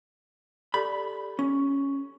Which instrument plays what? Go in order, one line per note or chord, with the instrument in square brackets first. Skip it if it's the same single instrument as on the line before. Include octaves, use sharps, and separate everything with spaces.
[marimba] G4 A4 D5 [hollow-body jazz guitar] B5
[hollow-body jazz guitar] C#4